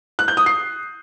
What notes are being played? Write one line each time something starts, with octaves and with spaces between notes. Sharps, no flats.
F#6
G6
D#6
C7